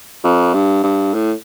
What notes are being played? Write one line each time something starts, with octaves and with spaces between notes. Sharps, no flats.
F2
G2
G2
A2